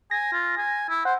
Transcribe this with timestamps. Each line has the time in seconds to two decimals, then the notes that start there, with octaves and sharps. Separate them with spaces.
0.11 G#5 A#6
0.33 F4
0.57 G#5
0.89 E4
1.05 C5 F#5